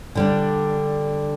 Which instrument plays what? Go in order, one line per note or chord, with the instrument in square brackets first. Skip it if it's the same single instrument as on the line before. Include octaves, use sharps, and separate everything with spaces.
[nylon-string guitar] D3 G3 D4